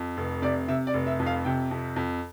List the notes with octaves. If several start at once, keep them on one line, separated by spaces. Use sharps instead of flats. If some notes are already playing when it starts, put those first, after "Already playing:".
Already playing: F2
F1
C3 D5
C3 E5
D5
F1
E5
F2
F5
C3 G5
F2
F2